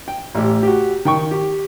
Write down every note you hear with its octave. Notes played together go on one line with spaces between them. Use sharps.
G5
A1 G4
F#4 G4
D#3 G5 C#6
G4